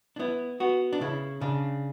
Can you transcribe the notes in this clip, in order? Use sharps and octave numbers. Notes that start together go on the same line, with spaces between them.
D4
B3 E4
B3 F#4
D4
C#3 E4
C#3 D4